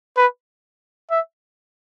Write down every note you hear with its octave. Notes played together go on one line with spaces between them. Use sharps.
B4
E5